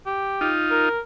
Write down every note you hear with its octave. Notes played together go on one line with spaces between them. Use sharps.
G4
D#4 F4
A#4